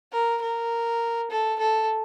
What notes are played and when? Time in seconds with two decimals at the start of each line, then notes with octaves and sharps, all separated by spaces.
0.12 A#4
0.41 A#4
1.31 A4
1.60 A4